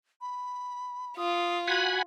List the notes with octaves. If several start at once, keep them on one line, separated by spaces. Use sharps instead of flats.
B5
F4 D#6
F#4 F#5 G#5 B5